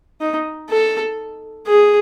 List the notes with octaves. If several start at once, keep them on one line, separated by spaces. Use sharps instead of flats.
D#4
A4
G#4